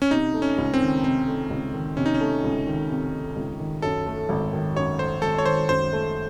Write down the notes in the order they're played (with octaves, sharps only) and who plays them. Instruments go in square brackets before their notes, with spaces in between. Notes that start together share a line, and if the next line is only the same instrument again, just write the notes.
[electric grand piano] C#4
[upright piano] C3 [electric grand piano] D#4
[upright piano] A3
[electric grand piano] C#4
[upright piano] C#2
[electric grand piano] C4
[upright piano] D#3
[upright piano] C3 [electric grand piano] C4
[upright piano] A3
C#2
D#3
[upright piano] C3 [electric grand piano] C#4
[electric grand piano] D#4
C#4
[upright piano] A3
C#2
D#3
C3
A3
C#2
D#3
[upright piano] F#2 [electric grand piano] A4
[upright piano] A3
G#1
D#3
[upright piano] F#2 [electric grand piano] C#5
[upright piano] A3 [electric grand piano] C5
[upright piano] G#1 [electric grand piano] A4
[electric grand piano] C#5
[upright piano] D#3 [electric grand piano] C5
[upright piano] F#2 [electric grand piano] C5
[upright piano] A3